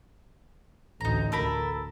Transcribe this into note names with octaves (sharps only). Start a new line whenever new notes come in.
A1 D2 D#4 A#5
D2 A4 A#4 B5